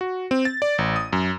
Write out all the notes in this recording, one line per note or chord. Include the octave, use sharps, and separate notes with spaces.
F#4
C4
A6
D5
A1
D#6
F#2